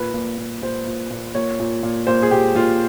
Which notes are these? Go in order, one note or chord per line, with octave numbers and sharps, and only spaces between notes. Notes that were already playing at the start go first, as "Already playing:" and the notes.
Already playing: A#2 B4
A#2
A#2
A#2 C5
A#2
A#2
A#2 C#5
A#2
A#2
A#2 C5
G#4
A#2 G4
A#2 F4